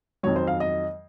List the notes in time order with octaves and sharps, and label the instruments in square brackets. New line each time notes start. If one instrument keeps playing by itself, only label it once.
[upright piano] F2 D#3 F#3 C#5
C5
F5
D#5